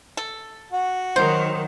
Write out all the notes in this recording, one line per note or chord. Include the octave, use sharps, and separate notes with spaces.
A4
F#4
D#3 F#3 C5